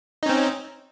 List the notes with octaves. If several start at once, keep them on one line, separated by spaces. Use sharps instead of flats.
C4 C#4 D#4